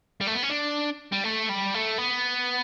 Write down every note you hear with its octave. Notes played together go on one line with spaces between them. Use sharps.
G3
A3
B3
C#4
D4
G3
A3
G3
A3
B3